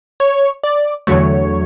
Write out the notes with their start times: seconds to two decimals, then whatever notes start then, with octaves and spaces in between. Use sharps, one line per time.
0.20 C#5
0.63 D5
1.07 E2 D3 F#3 A3 C#5